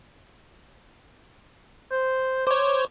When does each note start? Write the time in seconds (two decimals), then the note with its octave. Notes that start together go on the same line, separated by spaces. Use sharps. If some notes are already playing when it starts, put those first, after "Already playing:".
1.91 C5
2.47 C5 C#5 D6